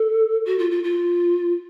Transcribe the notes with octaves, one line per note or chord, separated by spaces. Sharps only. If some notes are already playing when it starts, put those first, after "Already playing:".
Already playing: A4
F#4
F4
F4
F4